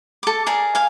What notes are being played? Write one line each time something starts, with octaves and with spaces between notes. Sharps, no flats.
A4 D6
G#4 A#4 D5
F5 G#5